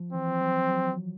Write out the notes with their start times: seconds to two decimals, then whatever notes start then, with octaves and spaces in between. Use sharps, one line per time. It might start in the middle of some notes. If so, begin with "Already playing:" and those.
Already playing: F3
0.13 E3 C4
0.27 F3
0.41 F#3
0.69 F#3